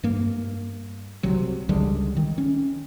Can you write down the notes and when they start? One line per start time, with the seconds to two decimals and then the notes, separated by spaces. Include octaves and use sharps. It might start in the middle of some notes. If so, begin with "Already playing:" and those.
0.03 G2 A#3
1.23 C2 C3 F#3
1.69 C#2 D3 G3 G#3
2.17 D#3
2.38 C#4